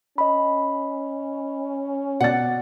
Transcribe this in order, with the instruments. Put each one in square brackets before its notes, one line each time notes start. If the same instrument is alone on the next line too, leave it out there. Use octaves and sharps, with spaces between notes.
[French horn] C#4 [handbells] D#5 B5
[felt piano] B2 D5 A6 [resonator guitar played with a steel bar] F#5